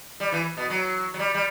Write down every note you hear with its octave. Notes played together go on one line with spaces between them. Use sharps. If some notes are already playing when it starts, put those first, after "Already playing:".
G3
E3
B2
F#3
F#3
G3
G3